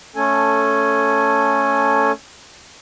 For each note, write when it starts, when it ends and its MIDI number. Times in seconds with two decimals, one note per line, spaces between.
0.16 2.12 57
0.16 2.12 61
0.16 2.12 69
0.16 2.12 80